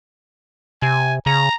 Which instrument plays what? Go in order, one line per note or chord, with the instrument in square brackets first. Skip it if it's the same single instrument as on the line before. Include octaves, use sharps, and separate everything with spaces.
[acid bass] C3 [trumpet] G#5
[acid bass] C#3 [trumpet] A#5